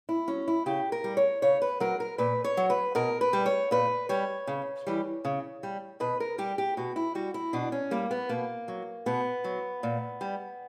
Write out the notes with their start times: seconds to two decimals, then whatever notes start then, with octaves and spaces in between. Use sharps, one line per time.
0.09 E4
0.28 F#3 C#4
0.48 E4
0.66 C#3 G4
0.92 A#4
1.04 G3
1.17 C#5
1.42 C#3 C#5
1.62 B4
1.80 F#3 A#4
2.00 A#4
2.18 A#2 B4
2.44 C#5
2.57 F#3
2.70 B4
2.95 B2 A#4
3.21 B4
3.33 G3
3.46 C#5
3.71 A#2 B4
4.09 G3 C#5
4.47 C#3
4.87 E3 G3
5.25 C#3
5.63 G3
6.00 B2 B4
6.20 A#4
6.38 G3 G4
6.58 G4
6.77 B2 F#4
6.96 E4
7.15 G3 F#4
7.34 E4
7.53 B2 D4
7.72 C#4
7.91 G3 A#3
8.11 B3
8.29 B2 A#3
8.68 F#3
9.06 B2 B3
9.44 F#3
9.83 A#2
10.21 G3